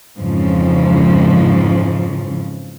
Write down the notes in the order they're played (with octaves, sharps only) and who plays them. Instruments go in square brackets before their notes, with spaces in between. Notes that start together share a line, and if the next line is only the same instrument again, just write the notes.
[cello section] F2 G#2 C#3 E3 F3